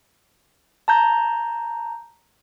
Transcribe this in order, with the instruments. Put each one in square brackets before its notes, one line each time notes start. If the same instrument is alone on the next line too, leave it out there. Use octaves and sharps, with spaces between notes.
[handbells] A5 A#5 G6